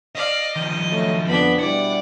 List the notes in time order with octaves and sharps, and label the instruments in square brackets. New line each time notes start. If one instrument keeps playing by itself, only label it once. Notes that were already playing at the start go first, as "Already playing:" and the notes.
[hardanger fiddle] D5 F5 [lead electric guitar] D#5
[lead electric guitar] D#3 F3 [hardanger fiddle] D#5
[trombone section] F#3 A3
[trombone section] F2 B3 [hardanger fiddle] D4 B5
[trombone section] B2 G3 E4 [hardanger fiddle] D5 [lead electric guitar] F#5